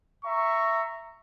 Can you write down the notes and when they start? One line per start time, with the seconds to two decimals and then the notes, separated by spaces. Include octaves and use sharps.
0.25 E5 A#5 C#6